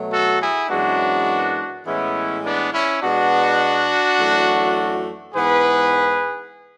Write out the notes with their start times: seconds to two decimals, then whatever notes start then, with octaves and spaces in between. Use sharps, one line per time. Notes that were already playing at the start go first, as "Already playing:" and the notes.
Already playing: B2 F#3 A3
0.11 F#4 A4
0.41 E4 G#4
0.69 F#2 E3 G#3 B3 D4 F#4
1.86 A2 E3 G#3 B3 C#4 E4
2.44 B3 D4
2.73 C#4 E4
3.02 B2 G#3 B3 D4 F#4
4.19 F#2 E3 A3
5.35 G#2 E3 B3 G#4 B4